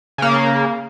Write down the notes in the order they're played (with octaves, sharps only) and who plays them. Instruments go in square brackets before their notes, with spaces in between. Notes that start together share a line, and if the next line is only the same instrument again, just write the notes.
[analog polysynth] C#3 A#3